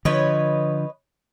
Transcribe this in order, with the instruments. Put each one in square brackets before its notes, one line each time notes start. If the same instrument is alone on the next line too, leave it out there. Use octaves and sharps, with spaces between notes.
[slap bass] D3 F3 [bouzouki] B4 C#5 D#5